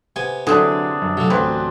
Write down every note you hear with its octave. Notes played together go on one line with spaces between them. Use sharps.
C3 B3 G#5
D3 F#3 C4 D4 E4 G#4
F#2
C3 F#3 A3
A1 D2 F#3 C4 B4